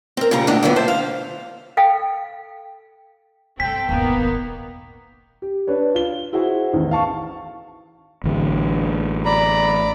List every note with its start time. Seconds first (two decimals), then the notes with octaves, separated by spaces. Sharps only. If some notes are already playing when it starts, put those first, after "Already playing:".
0.17 C4 A#4
0.31 A#2 C#3 G3 A#5
0.47 A2 D3 A#3 D4 D#5
0.63 F2 D3 F#3 B3
0.76 C5 E5 A5
0.88 F5
1.77 A4 F5 G5
3.60 G2 C3 C4 A4 G5 B6
3.89 D#1 G#1 D#3 A#3 B3
5.42 G4
5.67 D4 B4 C#5
5.95 F4 G7
6.33 E4 F#4 G#4 C5 F#5
6.73 A1 E2 D#3
6.91 F5 A5 C#6
8.24 A1 D3
9.25 D5 A#5 B5